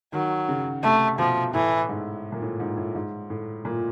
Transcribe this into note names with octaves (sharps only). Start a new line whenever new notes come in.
D#3 F#3
C#3
C3 A3
B2 F3
A2 E3
G#2
A#2
A2
G#2
A2
G#2
A2
A#2